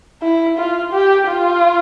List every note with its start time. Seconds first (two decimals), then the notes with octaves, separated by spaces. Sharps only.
0.22 E4
0.57 F4
0.93 G4
1.27 F4